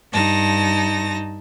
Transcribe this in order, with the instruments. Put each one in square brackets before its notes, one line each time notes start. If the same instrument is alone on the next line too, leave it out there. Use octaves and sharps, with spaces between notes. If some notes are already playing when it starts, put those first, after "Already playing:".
[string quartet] G2 D#4 A5 A#6